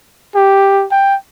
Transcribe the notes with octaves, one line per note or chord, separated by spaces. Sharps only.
G4
G5